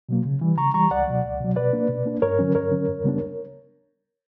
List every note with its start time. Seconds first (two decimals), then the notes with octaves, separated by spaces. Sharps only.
0.09 B2 F#3 A#3
0.25 C#3
0.41 E3 G3
0.58 C#3 A#5 C#6
0.74 E3 G3 A#5 C#6
0.91 C#2 D5 F#5
1.08 B2 F#3
1.24 C#2
1.40 B2 F#3
1.56 B2 B4 D5
1.73 A#3 D4
1.89 B2
2.06 A#3 D4
2.22 G2 A#4 C#5
2.39 D3 F#3 C#4
2.55 G2 A#4 C#5
2.71 D3 F#3 C#4
2.88 F#2
3.04 C#3 G3 B3 D4